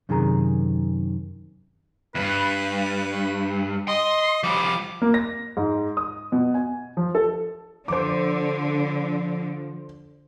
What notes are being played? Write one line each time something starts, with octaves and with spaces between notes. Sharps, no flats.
F#2 C3 D#3 G#4 A#5
E2 G2 B4
D#5 C6
F3 G3 D6
A#3
A#6
G#2
D#6
B2
G#5
F3
A4
D3 F3 C5 D6